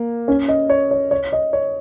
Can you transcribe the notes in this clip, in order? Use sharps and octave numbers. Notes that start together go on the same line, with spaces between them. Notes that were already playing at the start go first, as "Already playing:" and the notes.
Already playing: A#3
C#4
D#5
C#5
C#5
C#5
D#5
C#5